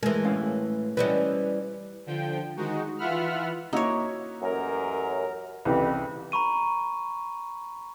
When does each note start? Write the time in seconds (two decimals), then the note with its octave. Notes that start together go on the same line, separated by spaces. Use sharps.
0.03 E3 G#3 A#4
0.25 A2 C#4 F5
0.97 E3 G3 C#4 B4 C5 D#5
2.06 D3 F3 G5
2.57 D#3 G#3 D#4 F#4
2.98 E3 F4 E5 F#5 B5 F6
3.73 A#3 D#4 E4 F#4 C#5
4.42 A1 F#2 A#4
5.65 C2 F2 C#3 E3 C4 G4 B4
6.32 A#5 B5 C#6 D#7